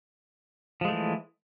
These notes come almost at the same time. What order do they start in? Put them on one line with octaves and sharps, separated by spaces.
F3 G#3 A3 E3